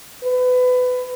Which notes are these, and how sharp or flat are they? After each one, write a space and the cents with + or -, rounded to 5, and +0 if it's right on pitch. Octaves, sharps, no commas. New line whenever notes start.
B4 +25